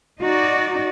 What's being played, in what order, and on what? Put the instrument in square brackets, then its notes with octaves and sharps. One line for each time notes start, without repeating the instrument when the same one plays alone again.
[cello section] D#4 F#4 D5